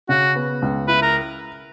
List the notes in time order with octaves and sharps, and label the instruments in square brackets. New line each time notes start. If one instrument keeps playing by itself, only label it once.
[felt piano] C#3 [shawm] F#4
[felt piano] B3
C#2
[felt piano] E4 [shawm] B4
[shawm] A#4